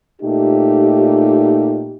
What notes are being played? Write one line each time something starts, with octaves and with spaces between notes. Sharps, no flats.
A#2 A3 D#4 G4